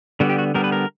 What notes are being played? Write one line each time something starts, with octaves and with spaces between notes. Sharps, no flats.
D3 G3 B3 F#4
G4
F#4
D3 G3 B3 A#4
B4
A#4